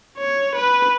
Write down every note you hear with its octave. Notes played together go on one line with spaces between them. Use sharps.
C#5
B4